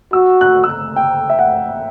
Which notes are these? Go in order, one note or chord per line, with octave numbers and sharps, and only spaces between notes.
F#4 E6
F#6
E6
F#6
G5
E5
F#5